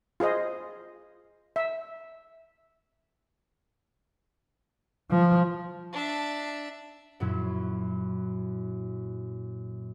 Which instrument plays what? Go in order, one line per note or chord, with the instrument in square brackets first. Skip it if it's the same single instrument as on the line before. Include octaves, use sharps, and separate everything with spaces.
[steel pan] F4 G#4 C5 D#5
E5
[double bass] F3
[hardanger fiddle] D4 E5
[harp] F#2 A#2 F#3 E4